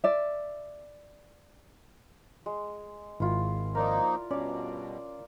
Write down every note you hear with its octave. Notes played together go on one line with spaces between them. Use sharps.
D5 E5
G#3
G#1 E4 F4
F3 A#3 D#4 A#4 D5
G2 B2 C#4 D5 F5